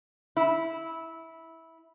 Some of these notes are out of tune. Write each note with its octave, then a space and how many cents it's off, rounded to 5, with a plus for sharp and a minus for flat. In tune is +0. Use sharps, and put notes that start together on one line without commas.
E4 -15